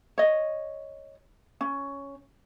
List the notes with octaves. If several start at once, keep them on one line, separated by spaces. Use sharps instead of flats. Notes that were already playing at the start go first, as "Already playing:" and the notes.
C#5 D#5
C#4